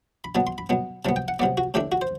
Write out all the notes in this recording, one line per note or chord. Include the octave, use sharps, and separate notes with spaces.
B5
B2 F#3 B3 A5
C6
B5
B2 F#3 B3
C3 F#3 B3 A5
G5
F#5
C3 F#3 B3 D5
F#4
A2 E3 A3 D4 G4
F#4
C5